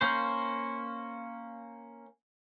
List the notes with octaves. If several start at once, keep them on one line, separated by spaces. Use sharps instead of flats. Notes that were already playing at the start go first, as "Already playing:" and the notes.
A#3 C#4 C5